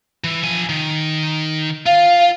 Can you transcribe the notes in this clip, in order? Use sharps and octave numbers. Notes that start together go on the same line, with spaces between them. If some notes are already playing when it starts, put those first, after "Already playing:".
E3
F3 G#5
D#3
F4 F5